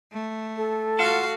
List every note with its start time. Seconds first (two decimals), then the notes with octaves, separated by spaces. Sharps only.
0.13 A3
0.57 A4
0.99 F4 F#4 F5 F#5 A5